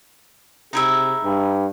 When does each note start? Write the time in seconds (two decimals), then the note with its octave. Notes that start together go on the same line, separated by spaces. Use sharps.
0.73 C3 D#4 E4 G#4 E5
1.24 G2